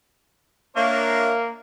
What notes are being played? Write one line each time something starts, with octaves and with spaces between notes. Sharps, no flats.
A#3 D4 C#5 E5